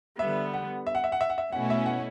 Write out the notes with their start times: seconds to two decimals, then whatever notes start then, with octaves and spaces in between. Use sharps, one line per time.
0.19 D3 G3 B3 E5
0.54 F#5
0.87 E5
0.95 F#5
1.04 E5
1.12 F#5
1.21 E5
1.30 F#5
1.38 E5
1.52 B2 A3 C#4 E4 F#5
1.70 E5
1.86 F#5